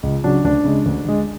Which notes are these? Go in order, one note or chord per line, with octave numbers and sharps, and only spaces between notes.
C#2
C#3 F#3 D4
D2 D4
C#3 G#3
D2
D3 G#3